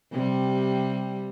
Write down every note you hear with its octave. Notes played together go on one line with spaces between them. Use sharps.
C3 G3